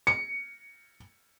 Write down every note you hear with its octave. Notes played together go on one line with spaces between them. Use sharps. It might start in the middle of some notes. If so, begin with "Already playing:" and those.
C#7